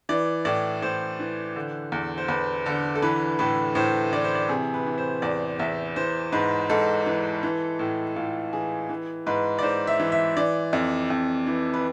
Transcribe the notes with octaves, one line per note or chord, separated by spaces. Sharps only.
E3 D5
A2 D5
A2 C5
E3
D3
E2
C5
E2 B4
D3 A4
A4
E3 B4
A2 B4
A2 C5
E3 D5
C5
D5
C3 G#4
B4
E3
C5
E2 D5
E2 E5
E3 C5
G#2 B4
G#2 A4
E3
E3
A2
A2 F4
E3 G#4
E3
G#2 B4
D5
G#2 C5
E5
E3
E5
E3 D5
F2
F2
E3
B4